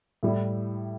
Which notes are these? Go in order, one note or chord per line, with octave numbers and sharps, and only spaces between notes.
A2 G3 E4